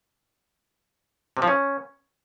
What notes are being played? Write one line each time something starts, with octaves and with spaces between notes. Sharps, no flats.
C3
F3
C#4